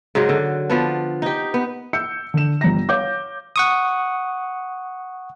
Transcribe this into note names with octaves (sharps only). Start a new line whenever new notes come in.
G#2 C#3 F#3 G#3
D3
F3 B3 D4
D#4 G4
B3
E6 G6 C#7
D3 E7
G1 G3 A#5 A#6
C#5 F5 D6 G6
F#5 C#6 D#6